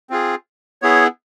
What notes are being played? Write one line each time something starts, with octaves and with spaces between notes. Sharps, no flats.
C4 F4 G#4
B3 E4 G#4 C#5